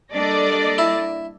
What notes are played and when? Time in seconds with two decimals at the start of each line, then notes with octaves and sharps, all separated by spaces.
0.13 G3 A#3 D4 A4 D5 D#5
0.78 E4